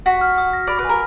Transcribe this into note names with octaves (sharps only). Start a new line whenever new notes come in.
F#4 B6
F6
D#6
A#6
D5 B5
B4
A#4 G#5